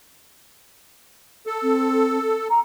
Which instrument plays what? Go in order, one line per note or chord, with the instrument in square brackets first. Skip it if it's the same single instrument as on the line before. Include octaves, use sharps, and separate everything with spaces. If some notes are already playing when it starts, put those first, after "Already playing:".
[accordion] A4
[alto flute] C4
A#5